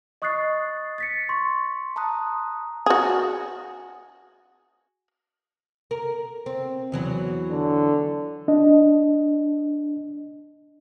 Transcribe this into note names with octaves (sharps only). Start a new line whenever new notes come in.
D#5 C#6 D#6 F#6 A6 C7
A6 B6 C#7
C6 C#6
A5 A#5 C6 D#6 F#6
F#4 G#4
A#4
C4
E2 E3 F#3
D3
D4 D#5